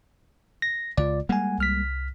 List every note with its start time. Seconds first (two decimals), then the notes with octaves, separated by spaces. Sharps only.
0.62 A#6
0.97 C#2 F4 D5
1.29 G3 G#3 A#3 F#5 G#5
1.58 C2 F6 B6